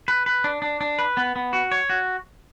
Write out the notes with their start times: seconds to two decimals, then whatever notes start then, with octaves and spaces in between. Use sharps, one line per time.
0.08 B4
0.26 B4
0.44 D4
0.62 D4
0.81 D4
0.99 B4
1.17 B3
1.36 B3
1.53 F#4
1.72 C#5
1.90 F#4